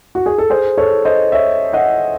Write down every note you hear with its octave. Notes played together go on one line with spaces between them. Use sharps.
F#4
G#4
A4
G#4 C5
A4 C#5
C5 D#5
C#5 E5
D#5 F#5